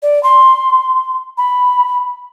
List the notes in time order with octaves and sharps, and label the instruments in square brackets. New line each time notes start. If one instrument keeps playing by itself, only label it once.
[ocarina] D5
C6
B5